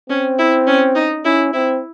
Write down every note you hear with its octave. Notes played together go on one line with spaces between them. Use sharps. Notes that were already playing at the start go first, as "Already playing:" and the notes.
C4 C#4
E4
C#4
D#4
C#4 E4
C4 E4